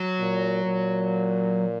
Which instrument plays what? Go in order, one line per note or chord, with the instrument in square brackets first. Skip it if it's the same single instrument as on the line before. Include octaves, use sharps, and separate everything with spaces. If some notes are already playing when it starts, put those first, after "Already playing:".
Already playing: [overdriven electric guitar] F#3
[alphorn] A#2
A#2